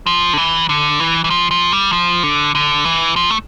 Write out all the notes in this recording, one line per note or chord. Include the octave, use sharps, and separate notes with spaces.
F3
D3
E3
D3
E3
E3
F3
F3
G3
F3
D3
D3
E3
F3
A3